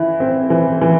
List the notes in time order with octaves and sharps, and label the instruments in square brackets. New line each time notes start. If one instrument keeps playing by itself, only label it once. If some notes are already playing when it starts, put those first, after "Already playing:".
Already playing: [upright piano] E3 E4
C4
E3
E3